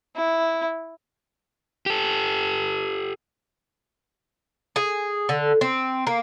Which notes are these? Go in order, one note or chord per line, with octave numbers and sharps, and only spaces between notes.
E4
G4 A4
G#4
D3
C4
A#3